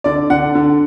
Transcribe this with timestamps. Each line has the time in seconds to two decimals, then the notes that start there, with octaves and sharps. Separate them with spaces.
0.04 D3 D5
0.30 D3 F#5
0.55 D3